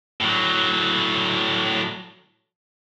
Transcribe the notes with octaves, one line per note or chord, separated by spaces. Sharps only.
A2 F#3